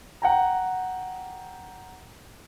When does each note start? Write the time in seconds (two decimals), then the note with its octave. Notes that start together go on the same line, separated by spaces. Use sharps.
0.22 F#5 G5 A#5